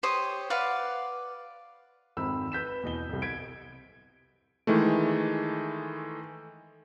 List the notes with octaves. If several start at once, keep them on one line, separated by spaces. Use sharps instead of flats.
G4 C5 C#5 D#6
B4 D5 F5 F#5
G#1 F2 C4 B5 E6
B4 G6 B6 E7
E2 B2 D#5 G7
C2 F2
G#6 B6 D7
D#3 E3 G#3 A3